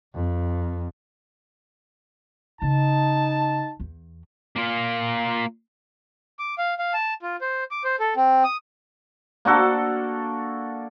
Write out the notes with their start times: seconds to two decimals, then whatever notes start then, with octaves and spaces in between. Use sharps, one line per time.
0.15 F2
2.62 C#3 D#4 A5
3.80 E2
4.56 A#3 F4
6.39 D6
6.58 F5
6.79 F5
6.94 A5
7.22 F4
7.41 C5
7.71 D6
7.84 C5
8.00 A4
8.16 C4
8.44 D#6
9.45 A#3 D4 F#4 A4